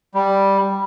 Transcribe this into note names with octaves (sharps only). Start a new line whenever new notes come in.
G3